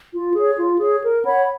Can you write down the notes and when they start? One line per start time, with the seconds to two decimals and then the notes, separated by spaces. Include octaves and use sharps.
0.13 F4
0.34 G#4 C#5
0.57 F4
0.79 G#4 C#5
1.03 A#4
1.24 C#5 F#5 B5